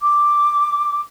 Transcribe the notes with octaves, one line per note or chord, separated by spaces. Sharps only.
D6